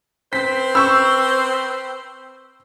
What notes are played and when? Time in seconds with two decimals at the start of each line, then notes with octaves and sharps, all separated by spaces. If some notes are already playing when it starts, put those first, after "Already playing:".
0.33 C4 B4 C5 B6
0.75 C#6 E6